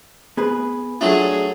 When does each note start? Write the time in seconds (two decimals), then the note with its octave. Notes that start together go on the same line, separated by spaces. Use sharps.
0.37 B3 G#4 B4
1.01 F#3 A3 D4 F4 G#4